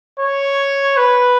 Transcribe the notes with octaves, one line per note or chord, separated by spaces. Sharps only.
C#5
B4